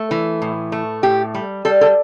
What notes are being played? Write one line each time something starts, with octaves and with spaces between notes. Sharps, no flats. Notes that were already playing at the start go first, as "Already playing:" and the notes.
Already playing: A3
E3
A2
A3
A2 G4
G3
G3 A4
A4